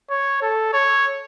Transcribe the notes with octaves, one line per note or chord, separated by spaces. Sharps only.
C#5
A4
C#5